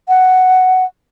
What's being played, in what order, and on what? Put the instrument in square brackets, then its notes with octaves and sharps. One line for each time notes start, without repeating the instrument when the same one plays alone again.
[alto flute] F#5